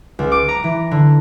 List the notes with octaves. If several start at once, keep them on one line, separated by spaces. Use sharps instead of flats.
C#2
D6
A#5
E3
D3